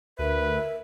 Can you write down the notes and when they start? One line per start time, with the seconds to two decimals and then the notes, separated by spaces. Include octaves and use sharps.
0.19 D2 A#4 B4 E5